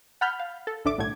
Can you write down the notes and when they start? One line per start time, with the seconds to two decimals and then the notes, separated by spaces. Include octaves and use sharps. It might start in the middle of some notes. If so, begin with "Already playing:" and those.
0.21 F#5 A5 B5 F6 G6
0.40 F5
0.67 A4
0.85 A1 D2 D4 A4 E5 D6
0.98 B1 A2 D3 G3 A3 G#6